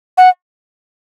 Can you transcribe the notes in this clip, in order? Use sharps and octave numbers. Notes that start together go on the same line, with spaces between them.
F#5